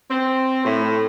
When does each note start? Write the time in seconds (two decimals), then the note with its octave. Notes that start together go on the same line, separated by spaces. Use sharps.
0.10 C4
0.65 A2